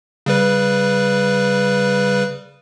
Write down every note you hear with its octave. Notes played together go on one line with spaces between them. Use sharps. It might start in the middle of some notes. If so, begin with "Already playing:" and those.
C#3 G3 B4